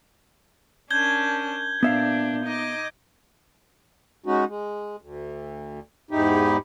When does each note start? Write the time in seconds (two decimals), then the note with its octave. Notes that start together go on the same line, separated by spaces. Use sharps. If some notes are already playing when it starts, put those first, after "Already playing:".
0.91 C#4 D4 A#4 G6 G#6 G7
1.83 A#2 B3 D4 E5 F5
2.45 D#4 D#5 D6
4.26 G#3 C#4 D#4 F#4
4.48 G#3
5.02 D2
6.11 E2 G#2 D#4 E4 G4